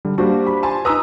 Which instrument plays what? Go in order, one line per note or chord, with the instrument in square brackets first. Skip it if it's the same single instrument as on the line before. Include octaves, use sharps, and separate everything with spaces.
[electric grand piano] D3 G3
[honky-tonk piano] G3 A#3 F#4 [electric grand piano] D4 G4 C5
[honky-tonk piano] B5
G#5 A5 C6
[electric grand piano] D#4 B4 [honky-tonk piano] A#5 D#6 E6